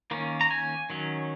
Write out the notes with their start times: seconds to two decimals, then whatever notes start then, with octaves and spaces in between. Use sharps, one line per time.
0.11 D#3 A#3 C#4
0.41 A#5
0.51 G#5
0.90 D#3 F#3 C#4